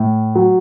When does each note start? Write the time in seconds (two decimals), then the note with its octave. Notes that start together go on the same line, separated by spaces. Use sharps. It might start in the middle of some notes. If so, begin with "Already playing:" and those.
Already playing: A2
0.35 F#3